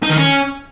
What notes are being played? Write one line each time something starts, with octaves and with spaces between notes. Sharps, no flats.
D#4
D#3
C#4